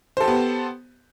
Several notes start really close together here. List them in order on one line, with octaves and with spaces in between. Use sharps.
C5 A4 G4 B3